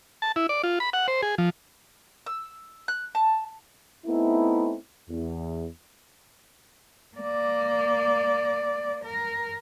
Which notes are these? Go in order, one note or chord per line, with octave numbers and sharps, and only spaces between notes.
A5
E4
D5
F4
B5
F#5
C5
G#4
F3
E6
F#6
A5
A3 B3 C4 D#4 E4
E2
A#3 D5
A#4